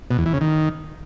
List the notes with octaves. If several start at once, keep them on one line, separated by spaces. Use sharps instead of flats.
B2
E2
E3
C#3
D#3